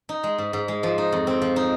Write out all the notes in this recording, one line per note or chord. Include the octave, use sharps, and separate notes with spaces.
D#4
G#3
G#2
G#2
G#3
F3
D#4
F2
C4
F3
D#4